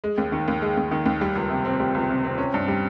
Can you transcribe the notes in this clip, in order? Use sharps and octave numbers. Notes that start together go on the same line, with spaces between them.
G#3
D#2
D#3
D#2
G#3
D#2
D#3
D#2
G3
C#2
C3
C4
G3
C#2
C3
C4
C#4
G2
G3